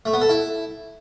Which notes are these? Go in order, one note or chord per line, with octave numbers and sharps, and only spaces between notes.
A3
B3
A4
E4